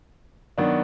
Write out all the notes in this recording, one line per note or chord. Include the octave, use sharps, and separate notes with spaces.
D#3 F#3 B3 D4